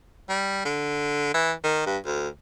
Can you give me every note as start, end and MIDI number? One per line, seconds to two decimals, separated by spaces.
0.29 0.62 55
0.65 1.29 50
1.34 1.52 52
1.64 1.82 51
1.86 1.98 43
2.05 2.28 38